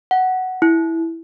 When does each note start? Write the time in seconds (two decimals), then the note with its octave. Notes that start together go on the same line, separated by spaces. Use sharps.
0.11 F#5
0.62 E4